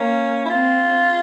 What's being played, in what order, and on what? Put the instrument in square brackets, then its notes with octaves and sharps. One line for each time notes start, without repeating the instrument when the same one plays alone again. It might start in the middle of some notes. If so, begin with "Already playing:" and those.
Already playing: [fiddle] A#3 [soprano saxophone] C#4
[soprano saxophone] E4
[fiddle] C4 [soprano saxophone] F4